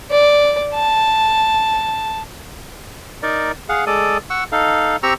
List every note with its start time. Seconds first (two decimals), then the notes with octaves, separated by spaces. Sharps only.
0.11 D5
0.75 A5
3.23 D#4 A#4 D5
3.69 G#4 F5 F#5
3.87 G#3 A4 D5 D#6
4.30 F#5 C#6 E6
4.52 D#4 A4 F5
5.03 C4 G4 A#5 C#6 E6